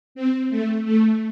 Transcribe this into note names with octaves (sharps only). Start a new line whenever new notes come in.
C4
A3
A3